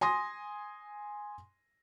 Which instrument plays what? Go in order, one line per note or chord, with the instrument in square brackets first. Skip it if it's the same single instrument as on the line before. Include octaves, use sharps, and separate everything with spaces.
[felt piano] G#5 C6 D#6 A#6